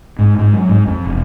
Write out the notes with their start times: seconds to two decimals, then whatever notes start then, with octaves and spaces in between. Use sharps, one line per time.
0.19 G#2
0.39 G#2
0.53 F#3
0.69 G#2
0.87 F2
1.06 E1